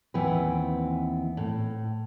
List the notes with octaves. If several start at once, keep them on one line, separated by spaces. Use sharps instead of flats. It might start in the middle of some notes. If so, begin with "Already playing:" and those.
D#2 E3 B3 C4 B4
A2